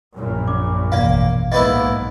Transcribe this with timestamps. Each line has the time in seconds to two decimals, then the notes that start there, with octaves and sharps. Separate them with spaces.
0.15 A#1 F#2 A#2
0.47 C#4 D6
0.92 E1 A1 A#3 D5 F5
1.52 B1 G#2 A#3 B3 E4 D#5